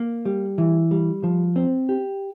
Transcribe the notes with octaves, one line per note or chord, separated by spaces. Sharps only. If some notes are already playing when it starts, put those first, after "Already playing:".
Already playing: A#3
G3
E3
G3
F3
C4
G4